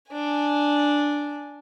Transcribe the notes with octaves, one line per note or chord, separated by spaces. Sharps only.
D4 G#5